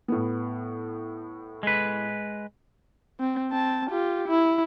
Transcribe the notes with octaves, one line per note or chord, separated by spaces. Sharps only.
A2 B3
G#3 B4
C4
C4 A5
F4 G4
E4